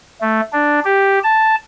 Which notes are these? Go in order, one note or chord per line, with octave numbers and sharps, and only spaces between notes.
A3
D4
G4
A5